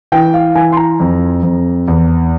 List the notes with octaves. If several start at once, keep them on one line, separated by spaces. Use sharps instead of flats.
E3 G5
F5
E3 G#5
C6
A#5
F2
F2
E2